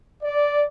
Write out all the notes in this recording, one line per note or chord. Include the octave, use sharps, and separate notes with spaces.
D5